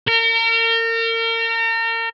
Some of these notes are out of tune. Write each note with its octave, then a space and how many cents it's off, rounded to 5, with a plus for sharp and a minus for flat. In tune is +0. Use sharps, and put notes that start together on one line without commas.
A#4 -35